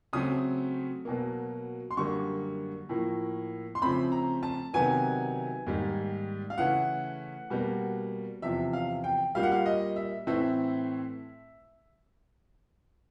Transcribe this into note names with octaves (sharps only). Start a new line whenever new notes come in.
C#3 F#3 A3 C4 D#6
B2 F#3 A#3
C6
F#2 D3 G3 A#3 C#6
A2 F3 A#3
C6
C#3 F3 A3 C4 B5
A#5
A5
C3 D#3 F#3 B3 G#5
G#2 D#3 G3 A#3
F5
C#3 E3 A3 F#5
B2 G3 A#3
E2 C3 F3 E5
F5
G5
A#2 G3 A#3 F5
F#5
F5
D#5
E5
A2 E3 A3 C4 E5